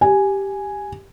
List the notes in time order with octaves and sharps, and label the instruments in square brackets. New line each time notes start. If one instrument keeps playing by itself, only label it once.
[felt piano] G4 G#5